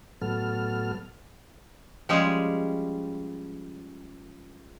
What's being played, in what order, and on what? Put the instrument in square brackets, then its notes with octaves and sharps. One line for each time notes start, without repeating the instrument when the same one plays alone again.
[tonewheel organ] A2 F#3 B3 A4 F6
[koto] F3 G3 G#3 C#4 G4 G#4